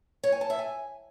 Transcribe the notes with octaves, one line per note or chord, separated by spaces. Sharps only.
C#5
G#5
A5
E5
G#5